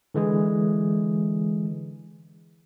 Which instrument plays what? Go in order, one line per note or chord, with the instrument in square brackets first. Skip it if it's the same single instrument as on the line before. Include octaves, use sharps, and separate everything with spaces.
[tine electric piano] D3 E3 G#3 G#4